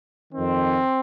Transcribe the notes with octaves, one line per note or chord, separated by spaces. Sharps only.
F2 D#3 C4